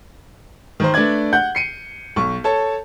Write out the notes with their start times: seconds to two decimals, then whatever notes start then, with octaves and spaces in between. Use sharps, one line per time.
0.80 D#3 A#4 C5
0.94 A3 D4 B4 D5 G#6
1.33 F#5 G6
1.55 C7 C#7 D#7
2.16 B1 C#6
2.44 A4 C#5 A5